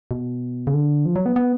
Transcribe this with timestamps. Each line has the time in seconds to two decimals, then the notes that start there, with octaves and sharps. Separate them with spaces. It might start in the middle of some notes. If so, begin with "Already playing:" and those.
0.11 B2
0.67 C#3
0.74 D3
1.05 F3
1.16 F#3
1.26 B3
1.36 B3